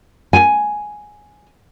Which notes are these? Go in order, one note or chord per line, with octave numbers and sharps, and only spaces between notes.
G#5